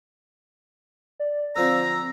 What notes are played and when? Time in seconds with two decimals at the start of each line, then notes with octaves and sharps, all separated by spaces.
1.20 D5
1.56 D3 F3 C4 A#5 E6